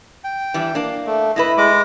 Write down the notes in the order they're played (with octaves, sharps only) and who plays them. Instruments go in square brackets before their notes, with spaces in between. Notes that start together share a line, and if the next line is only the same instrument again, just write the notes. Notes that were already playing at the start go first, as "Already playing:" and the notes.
[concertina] G5
[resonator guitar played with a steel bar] E3 G3 D4
A#3 D4
[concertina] A3
[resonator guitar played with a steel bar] A2 E4 B4 [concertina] D#5
[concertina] G#3 D#5 D6